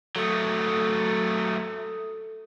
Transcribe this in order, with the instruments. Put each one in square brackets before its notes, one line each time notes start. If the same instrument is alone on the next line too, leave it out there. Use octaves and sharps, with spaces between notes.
[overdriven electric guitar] F#3 A3 [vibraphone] A4 D#6